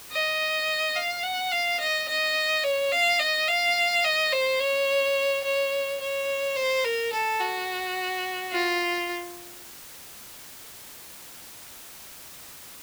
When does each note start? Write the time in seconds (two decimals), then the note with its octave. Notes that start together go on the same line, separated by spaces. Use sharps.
0.12 D#5
0.96 F5
1.23 F#5
1.51 F5
1.79 D#5
2.08 D#5
2.64 C#5
2.91 F5
3.19 D#5
3.48 F5
4.04 D#5
4.32 C5
4.60 C#5
5.44 C#5
6.00 C#5
6.56 C5
6.84 A#4
7.12 A4
7.40 F#4
8.53 F4